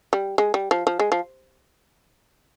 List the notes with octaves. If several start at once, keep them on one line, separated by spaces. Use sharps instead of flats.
G3
G#3
G3
F3
F3
G#3
F3